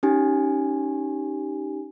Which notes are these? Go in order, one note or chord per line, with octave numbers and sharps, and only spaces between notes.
C#4 D#4 G4 G#5